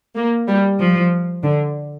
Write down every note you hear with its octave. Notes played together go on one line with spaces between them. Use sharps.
A#3
G3
F3
D3